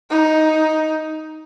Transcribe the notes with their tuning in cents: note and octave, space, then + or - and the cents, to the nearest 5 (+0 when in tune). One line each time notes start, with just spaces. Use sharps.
D#4 +10